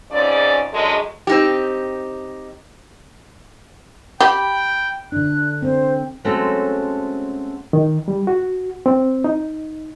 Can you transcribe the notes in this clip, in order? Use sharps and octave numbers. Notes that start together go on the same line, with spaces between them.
F2 G#2 C#3 C#4 D5
F#2 D3 G#3
C4 D#4 G4
G4 G5 B5
D3 D4 F#6
C4 C5
G#3 A3 C4 C#4 F#4 A4
D#3
G3
F#4
C4
D#4